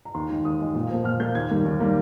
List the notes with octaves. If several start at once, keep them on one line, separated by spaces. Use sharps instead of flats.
A#5
D#2 C6
D#3 G#3
D#2 D#6
D#3 G#3
A#2
F3 A#3
A#2 F6
F3 A#3 G6
D#2 G#6
D#3 G3 A#3
D#2
D#3 G3 A#3